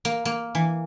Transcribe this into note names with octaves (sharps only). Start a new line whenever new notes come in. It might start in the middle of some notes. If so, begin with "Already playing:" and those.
A#3
A#3
E3